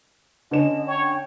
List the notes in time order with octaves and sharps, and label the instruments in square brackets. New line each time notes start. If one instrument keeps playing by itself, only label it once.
[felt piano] D3 C#4 E7 [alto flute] D#5
[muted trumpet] C#5 [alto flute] G5